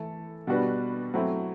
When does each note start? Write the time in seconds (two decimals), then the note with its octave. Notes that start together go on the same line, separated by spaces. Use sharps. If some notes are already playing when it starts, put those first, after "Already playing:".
Already playing: E3 A3 E4 A4
0.47 B2 G3 D4 F#4 B4
1.14 F#3 A3 C4 E4